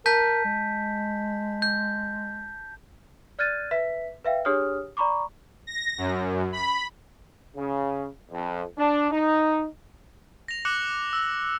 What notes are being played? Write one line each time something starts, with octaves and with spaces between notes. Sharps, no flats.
A#4 A5 G6 B6
G#3
G6
D5 F6 F#6 G#6 A6 D#7
B4 E5 B6
B4 E5 F5 G5
D4 G4 G#4 C#5 D#6 F6
D5 A#5 B5 C#6 D6
A#6
F#2
B5
C#3
F2
D4
D#4
A#6 F7
D6 F#6 C#7 F#7
E6